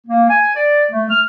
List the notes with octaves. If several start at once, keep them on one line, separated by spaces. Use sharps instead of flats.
A#3
G#5
D5
A3
F6